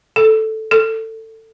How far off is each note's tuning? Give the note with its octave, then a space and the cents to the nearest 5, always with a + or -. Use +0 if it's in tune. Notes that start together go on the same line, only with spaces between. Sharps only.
A4 +0
A4 +20